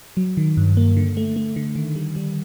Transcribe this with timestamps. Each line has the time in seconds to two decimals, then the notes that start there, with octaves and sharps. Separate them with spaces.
0.17 F#3
0.37 D#3
0.57 G2
0.77 A#3
0.97 D3
1.17 A3
1.36 A3
1.56 D3
1.76 D#3
1.95 G3
2.16 G3